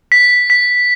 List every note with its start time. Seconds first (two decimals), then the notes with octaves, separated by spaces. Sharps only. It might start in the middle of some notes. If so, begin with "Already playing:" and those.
0.12 B6
0.50 B6